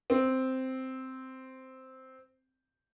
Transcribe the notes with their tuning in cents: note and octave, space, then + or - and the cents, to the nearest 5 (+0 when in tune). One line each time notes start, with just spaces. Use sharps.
C4 -5